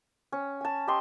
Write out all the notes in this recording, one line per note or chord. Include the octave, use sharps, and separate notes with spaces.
C#4
G#5 A5
G4 D#5 C6